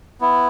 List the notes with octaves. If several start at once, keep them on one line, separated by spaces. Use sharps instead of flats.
B3 E4